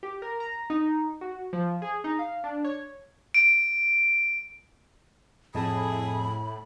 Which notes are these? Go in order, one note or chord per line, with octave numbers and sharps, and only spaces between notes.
G4
A#4
A#5
D#4
F#4
F3
G#4
D#4
F5
D4
C#5
D7
F2 A2 G#4 D#5 A5 B5